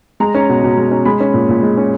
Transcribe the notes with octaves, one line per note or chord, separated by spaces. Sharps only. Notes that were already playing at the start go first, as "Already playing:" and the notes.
G#3 A#5
C#4
B2
B2
G#3
C#4
G#3 B5
C#4
A#2
A#2
G#3
C#4